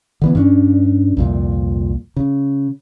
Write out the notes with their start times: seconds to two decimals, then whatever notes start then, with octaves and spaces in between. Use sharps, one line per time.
0.22 D3 E3 B3
0.35 G2 C#4 D4
1.17 C2 F2 A#2
2.16 C#3